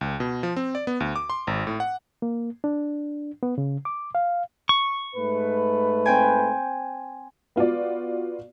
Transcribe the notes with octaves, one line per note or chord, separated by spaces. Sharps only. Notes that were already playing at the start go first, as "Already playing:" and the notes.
C#2
B2
F3
C4
D5
B3
D2
D6
C6
G#1
A2
F#5
A#3
D4
B3
C#3
D6
F5
C#6
G#2 A3 B4
C4 G5 G#5
B3 F4 F#4 D5